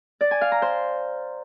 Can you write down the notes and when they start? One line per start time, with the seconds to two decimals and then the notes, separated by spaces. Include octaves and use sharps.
0.21 D5
0.31 G#5
0.41 F5
0.52 A#5
0.62 C5